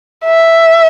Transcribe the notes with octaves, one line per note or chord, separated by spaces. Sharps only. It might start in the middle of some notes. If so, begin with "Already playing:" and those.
E5